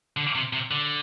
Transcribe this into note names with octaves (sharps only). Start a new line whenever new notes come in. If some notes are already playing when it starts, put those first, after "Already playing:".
D3
C3
C3
D3